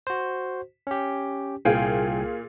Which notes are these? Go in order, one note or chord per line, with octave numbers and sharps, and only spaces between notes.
F#4 C5
C#4 G4
C2 A#2 G#4 F5 G5 G#5